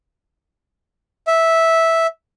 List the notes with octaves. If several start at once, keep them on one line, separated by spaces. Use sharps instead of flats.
E5